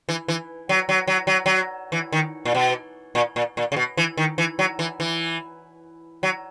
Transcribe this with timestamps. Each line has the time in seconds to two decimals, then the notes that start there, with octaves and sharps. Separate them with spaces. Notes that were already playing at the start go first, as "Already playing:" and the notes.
0.09 E3
0.28 E3
0.69 F#3
0.89 F#3
1.07 F#3
1.27 F#3
1.46 F#3
1.92 E3
2.12 D#3
2.45 A#2
2.55 B2
3.15 A#2
3.36 A#2
3.57 A#2
3.72 C#3
3.76 B2
3.97 E3
4.17 D#3
4.38 E3
4.59 F#3
4.79 E3
5.00 E3
6.23 F#3